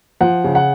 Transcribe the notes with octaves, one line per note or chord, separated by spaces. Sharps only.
F3 F#5
C#3
F#5